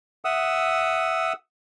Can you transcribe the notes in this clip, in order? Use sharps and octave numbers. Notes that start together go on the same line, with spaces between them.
E5 F#5 D#6 E6